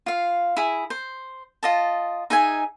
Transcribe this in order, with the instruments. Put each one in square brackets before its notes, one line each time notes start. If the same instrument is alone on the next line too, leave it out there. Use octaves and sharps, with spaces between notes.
[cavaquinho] F4 F5
E4 G#4
C5
F4 D#5 A5
D#4 G#4 E5 G#5